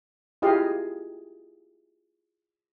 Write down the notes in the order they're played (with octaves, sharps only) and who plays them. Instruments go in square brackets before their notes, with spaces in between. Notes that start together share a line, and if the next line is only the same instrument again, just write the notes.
[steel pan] E4 F4 G4 G#4 D#5 F5